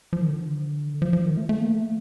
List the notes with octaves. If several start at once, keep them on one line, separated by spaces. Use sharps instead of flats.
F3
D#3
D3
F3
F3
D#3
A3
A3
A#3
A3